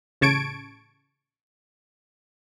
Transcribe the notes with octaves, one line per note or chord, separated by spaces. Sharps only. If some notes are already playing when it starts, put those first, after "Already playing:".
A1 C#3 A5 C#6 G#6 D7